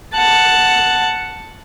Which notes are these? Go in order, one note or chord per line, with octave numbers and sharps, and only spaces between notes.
F#5 A5